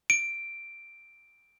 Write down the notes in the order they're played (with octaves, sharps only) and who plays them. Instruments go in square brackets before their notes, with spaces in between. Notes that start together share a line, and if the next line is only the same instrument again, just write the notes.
[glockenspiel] D7